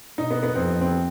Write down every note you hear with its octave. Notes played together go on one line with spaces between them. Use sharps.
B2 D#4
B3
B3
F2 C4
C4